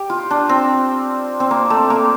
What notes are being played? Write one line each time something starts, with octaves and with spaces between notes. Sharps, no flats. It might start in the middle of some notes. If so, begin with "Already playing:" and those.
Already playing: G4
F4
D4
C4
C4
A#3
A3
A#3